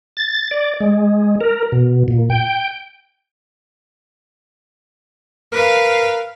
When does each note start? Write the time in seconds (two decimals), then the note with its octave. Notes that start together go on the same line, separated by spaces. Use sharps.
0.17 A6
0.51 D5
0.80 G#3
1.41 A#4
1.72 B2
2.08 A#2
2.30 G5
5.52 A#4 B4 F5